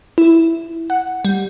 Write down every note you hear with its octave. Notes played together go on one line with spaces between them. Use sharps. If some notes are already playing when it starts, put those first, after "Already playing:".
E4
F#5
G3